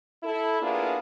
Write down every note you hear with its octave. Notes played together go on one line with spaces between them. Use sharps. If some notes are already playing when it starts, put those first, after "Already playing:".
E4 A4
A#3 B3 D4 E4 F4 G#4